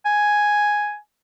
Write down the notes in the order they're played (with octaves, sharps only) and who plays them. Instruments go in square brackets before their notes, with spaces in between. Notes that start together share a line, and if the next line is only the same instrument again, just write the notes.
[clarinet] G#5